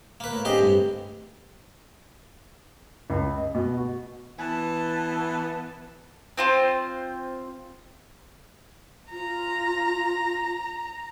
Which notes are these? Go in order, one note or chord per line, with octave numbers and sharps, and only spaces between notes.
A#3 B4
A2
C4 D4 G4 G#4 D#5
G2
C#2
D#5
B2
F#4
E3 B3 A5
C4 F4 C5
F4 A#5